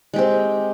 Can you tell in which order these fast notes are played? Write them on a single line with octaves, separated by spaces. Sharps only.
G#3 G4 C4